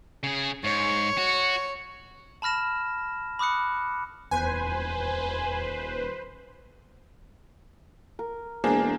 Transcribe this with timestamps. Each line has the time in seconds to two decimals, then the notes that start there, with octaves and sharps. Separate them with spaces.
0.23 C#3 G#4
0.64 G#2 C#5
1.18 F#4
2.42 A5 B5 F6 A#6 E7
3.39 B5 D6 D#6 F#6 C#7
4.31 D#1 E2 B4 C5 G#5
8.19 A#4
8.64 E1 A#3 D4 G#4 C5 A#5